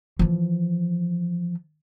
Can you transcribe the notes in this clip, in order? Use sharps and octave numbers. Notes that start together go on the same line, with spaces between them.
E3 F3